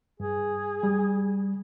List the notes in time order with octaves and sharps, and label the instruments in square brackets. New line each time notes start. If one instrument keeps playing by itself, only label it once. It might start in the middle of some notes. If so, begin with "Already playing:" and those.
[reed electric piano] G2 [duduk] G#4
[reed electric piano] G3